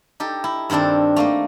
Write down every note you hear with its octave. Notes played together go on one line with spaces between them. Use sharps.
D#4 G4 A4
E4
G2 D#3 C4 D4 A4
A3 A#3 D#4